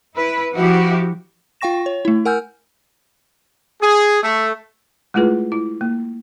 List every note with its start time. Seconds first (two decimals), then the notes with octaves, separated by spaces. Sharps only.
0.15 E4 B4
0.55 F3 E4 F#4 G4
1.61 F4 F5 G5 C#6 A#6 E7
1.86 C#5
2.05 A3 E4
2.25 A#4 F#5 G#5 E6 F6 G6
3.81 G#4
4.23 A3
5.14 G#3 A3 E4 F4 G#4 B4
5.52 E4
5.81 A#3